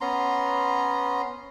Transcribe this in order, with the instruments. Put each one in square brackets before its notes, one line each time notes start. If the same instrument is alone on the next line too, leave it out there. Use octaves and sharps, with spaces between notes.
[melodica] B3 C#4 A#5 C6